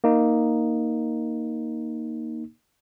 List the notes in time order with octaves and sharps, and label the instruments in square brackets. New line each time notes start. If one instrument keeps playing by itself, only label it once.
[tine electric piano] A#3 D#4